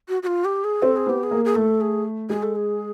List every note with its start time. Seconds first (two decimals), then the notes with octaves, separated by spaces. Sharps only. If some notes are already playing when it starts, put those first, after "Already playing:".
0.08 F#4
0.23 F#4
0.27 F4
0.45 G4
0.64 G#4
0.82 C4 A4
0.96 G#4
1.07 B3 G4
1.23 G#4
1.31 A#3
1.45 G#4
1.55 A3 A4
1.81 G#4
2.29 G#3 G#4
2.43 A4
2.55 G#4